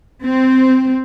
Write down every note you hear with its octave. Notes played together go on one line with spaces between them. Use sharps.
C4